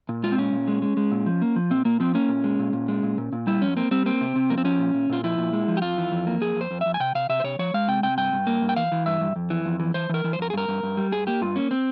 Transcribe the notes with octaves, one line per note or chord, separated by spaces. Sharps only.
A#2
G#3 F4
C4
A#2 C#4
A#2
G#3
G#3
G#3
A#2
F3
A#3
F3
A#2 C4
A#2 A#3
F3 C4
A#3 C#4
A#2
G#3
A#2
A#2
G#3
A#2
A#2
A#2
G3 E4
F2 C#4
A#3 C4
G3 C4
A#3 C4
C3
C3
F2 A#3
C4
F3 C#4
A#2
A#2
A#2 F4
F3 E4
A#2
G#3
F3
G4
F2 F4
E3
F2
A#3
F2 G#4
F2 C5
F2
F2 E5
G#5
C3 G5
C3 F5
C3 E5
C5
C3 C#5
F3 C#5
G#3 F5
C3 G5
C3 G5
G2 G5
G2
A#3
G2
G5
E3 F5
E3
G2 E5
G2
F2
E3
F2
E3
E3 C5
E3 A#4
E3
C5
F2 A#4
G#4
G2 A#4
G2
G2
G3
G2 G#4
A#3 G4
G2 F4
A#3 C#4
C4